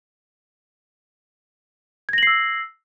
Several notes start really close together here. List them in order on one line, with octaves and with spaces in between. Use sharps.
G#6 A#6 F#7 C7 E6